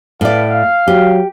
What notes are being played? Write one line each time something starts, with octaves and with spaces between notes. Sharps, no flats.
A2 A4 B4 D5 F5
F5
F#3 G4